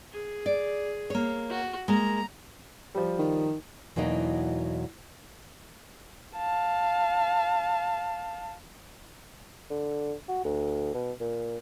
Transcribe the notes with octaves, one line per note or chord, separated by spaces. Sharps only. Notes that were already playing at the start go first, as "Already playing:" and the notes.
G#4
D5
A#3 C#5
F#4
G#3 A#3 A#5
F3 G3
D#3
E2 B2 F#3 A#3 D#4
F5 A5
D3
F#4
D2
B2
A#2